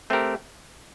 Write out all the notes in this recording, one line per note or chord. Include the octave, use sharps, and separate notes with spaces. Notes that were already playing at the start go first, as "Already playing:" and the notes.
A3 C4 G4 A#4